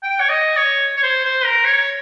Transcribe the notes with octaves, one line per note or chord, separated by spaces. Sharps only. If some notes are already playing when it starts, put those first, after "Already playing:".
G5
C#5
D#5
C#5
C#5
C5
C5
A#4
C#5